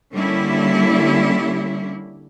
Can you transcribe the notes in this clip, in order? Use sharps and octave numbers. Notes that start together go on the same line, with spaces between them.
D3 G3 A#3 C#4 E4